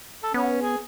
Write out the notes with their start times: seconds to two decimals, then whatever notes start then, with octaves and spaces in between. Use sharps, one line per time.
0.23 A4
0.34 B3 C#4
0.61 G#4